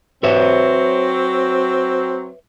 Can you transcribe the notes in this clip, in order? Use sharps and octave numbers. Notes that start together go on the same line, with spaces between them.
F#3 C4 B4 C#5 E5